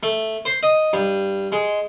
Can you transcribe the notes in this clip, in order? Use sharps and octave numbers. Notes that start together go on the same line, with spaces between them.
A3
C5
D#5
G2
G#3